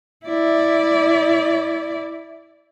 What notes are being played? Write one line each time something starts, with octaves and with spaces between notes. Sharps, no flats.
E4 D5